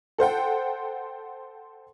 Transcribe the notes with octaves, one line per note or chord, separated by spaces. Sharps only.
A4 C5 F#5 G5